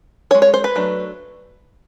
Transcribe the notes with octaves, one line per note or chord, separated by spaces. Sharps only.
C#4 C#5
G#3
C#5
C5
B4
F#3 A3 D4